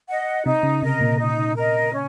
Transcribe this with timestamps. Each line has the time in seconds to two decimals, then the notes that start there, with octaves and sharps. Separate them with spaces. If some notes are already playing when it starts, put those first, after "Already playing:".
0.08 D#5 F#5
0.45 C3 D#4
0.63 C#3
0.82 C3 A#4 D#5
1.01 A#2
1.19 D#4
1.56 A#4 D#5
1.93 C#4